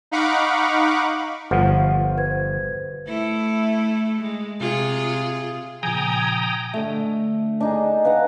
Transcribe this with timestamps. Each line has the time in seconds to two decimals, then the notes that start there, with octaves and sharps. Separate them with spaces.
0.11 D#4 F5 F#5 B5 C#6 D6
1.51 G1 F3 F#5
2.17 B4 C5 G#6
3.07 A3 E4
4.22 G#3
4.60 C3 F4 G#4
5.83 A#2 C#3 F3 G5 G#5 A#5 D#6
6.74 D3 A3
7.61 D4 D#4 G#4
8.04 B4 F5 F#5 A#5